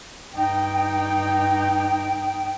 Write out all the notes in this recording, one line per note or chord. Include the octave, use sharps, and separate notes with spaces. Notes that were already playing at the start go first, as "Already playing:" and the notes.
G2 D#4 G5